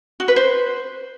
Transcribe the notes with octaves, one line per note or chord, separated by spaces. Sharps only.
F#4
B4
C5